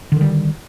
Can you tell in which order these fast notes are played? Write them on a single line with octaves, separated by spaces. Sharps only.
D3 D#3 G3